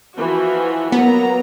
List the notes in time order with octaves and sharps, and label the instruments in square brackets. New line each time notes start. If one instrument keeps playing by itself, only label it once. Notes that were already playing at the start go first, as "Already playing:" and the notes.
[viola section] E3 F3 F#4
[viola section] F#3 A#3 A#5 [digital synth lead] B3